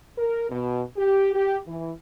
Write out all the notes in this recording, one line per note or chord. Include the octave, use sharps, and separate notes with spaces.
A#4
B2
G4
G4
E3